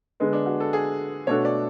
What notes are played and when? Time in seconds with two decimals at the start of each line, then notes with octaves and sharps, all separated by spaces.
0.20 D3 G#3 B3
0.33 D4
0.46 F#4
0.60 A4
0.73 G#4
1.27 B2 A3 D4 F#4 A4 C#5
1.45 D5